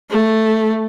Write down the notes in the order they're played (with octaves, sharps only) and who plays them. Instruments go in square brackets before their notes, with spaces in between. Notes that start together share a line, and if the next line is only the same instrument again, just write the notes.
[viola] A3